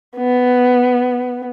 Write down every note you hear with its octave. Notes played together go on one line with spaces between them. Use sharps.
B3